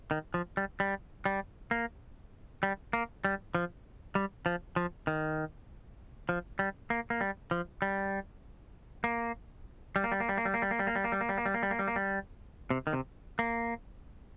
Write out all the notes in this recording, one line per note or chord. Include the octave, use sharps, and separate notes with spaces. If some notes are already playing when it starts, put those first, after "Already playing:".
D#3
F3
G3
G3
G3
A#3
G3
A#3
G3
F3
G3
F3
F3
D#3
F3
G3
A#3
A#3
G3
F3
G3
A#3
G3
A#3
G3
A#3
G3
A#3
G3
A#3
G3
A#3
G3
A#3
G3
A#3
G3
A#3
G3
A#3
G3
A#3
G3
A#3
G3
A#3
G3
C3
D#3
C3
A#3